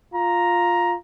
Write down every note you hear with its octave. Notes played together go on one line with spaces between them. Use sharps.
F4 A#5